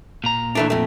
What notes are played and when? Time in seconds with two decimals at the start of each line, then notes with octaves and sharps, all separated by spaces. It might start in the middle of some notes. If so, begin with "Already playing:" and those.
0.24 A#2 A#5
0.55 E3 A3 D4
0.70 F2 A3